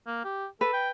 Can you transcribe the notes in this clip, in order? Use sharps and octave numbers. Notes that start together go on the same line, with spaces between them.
A#3
G4
A4 B4
G5